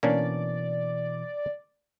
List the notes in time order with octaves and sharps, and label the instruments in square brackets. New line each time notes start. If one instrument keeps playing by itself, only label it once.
[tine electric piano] B2 E3 [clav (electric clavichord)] A#3 C#4 D4 [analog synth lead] D5